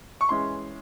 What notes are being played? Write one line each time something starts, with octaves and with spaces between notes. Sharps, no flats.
C#6
E3 G#3 C#4 C6